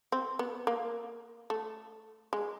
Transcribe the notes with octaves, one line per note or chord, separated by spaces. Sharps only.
C4
B3
A#3
A3
G#3